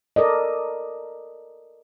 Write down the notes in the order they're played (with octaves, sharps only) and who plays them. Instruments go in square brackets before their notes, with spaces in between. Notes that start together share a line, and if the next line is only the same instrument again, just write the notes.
[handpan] A4 A#4 D5 D#5